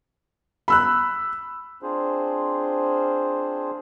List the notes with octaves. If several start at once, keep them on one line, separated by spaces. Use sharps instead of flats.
B5 E6 F#6
C4 D4 F4 G#4 C5